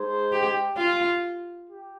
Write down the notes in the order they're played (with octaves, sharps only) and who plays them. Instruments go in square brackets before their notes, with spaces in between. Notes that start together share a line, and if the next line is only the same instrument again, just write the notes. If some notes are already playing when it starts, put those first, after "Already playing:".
Already playing: [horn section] G#3 D#4 G#4 C5
[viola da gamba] G4
F4
[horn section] G4